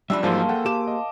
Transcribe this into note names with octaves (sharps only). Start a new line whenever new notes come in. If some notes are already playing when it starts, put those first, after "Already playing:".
F#2 F3 G3 D4 D5 E5 B5 E6
G#2 F3 F#3 A#3 G#4 C5 F5 A5
A4 F#5 G5
G4 D6 E7
D#5